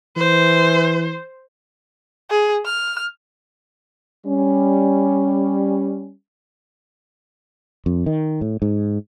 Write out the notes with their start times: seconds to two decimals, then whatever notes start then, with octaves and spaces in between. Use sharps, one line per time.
0.17 E3 C5
2.30 G#4
2.66 F6
4.27 G3 C#4
7.86 F2
8.06 D#3
8.41 A2
8.62 G#2